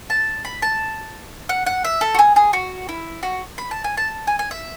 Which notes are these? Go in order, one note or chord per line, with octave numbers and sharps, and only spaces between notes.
A5
B5
A5
F#5
F#5
E5
A4
F#4
G#4
G#4
F#4
E4
F#4
B5
A5
G#5
A5
G#5
G#5
E5